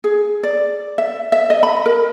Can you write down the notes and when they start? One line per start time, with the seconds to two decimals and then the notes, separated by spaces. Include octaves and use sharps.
0.04 G#4
0.43 D5
0.98 E5
1.32 E5
1.50 D#5
1.63 B5
1.86 A#4